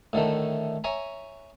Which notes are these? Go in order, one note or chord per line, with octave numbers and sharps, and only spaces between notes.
A2 D3 D#3 A3
C#5 E5 G#5 A#5